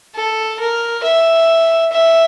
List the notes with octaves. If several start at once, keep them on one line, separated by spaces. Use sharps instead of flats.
A4
A#4
E5
E5